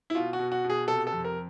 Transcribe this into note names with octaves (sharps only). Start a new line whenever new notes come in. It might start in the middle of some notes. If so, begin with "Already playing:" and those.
E4
B2 F4
F#4
B2
F#4
B2
G#4
C3 A4
A4
F2
A#4